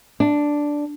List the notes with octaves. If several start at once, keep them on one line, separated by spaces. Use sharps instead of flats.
D4